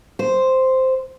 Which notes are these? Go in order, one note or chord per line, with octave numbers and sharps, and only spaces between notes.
C5